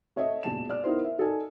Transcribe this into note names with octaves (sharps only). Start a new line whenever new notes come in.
A3 C#5 D#5 E5
E1 A#1 A5 E7
D5 F6
B3 D#4 E4 A#4 C5
E5
D#4 A4 D5 G#5